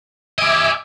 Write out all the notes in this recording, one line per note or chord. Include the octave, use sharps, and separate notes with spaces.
G4 D#5 E5 G#5 D6